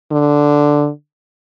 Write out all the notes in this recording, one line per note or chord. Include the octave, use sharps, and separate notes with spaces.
D3